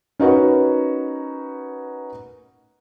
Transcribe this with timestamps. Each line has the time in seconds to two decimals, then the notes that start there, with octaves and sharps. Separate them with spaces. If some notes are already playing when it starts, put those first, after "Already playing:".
0.19 C#4 D#4 F#4 A#4 B4